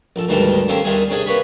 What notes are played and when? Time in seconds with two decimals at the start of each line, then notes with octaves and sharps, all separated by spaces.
0.16 A#1 A4
0.29 D2 G#2 D#3 E3 G3 A5
0.68 D#3 A#3 C#4 G4 A4 C5
0.85 D#2 D#3 G3 A3 G#4
1.10 C3 C#4 D4 G#4
1.26 A#3 B4 C#5 B5